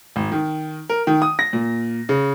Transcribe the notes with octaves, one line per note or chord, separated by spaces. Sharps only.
G#1
D#3
A#4
D#3
D#6
A#6
A#2
C#3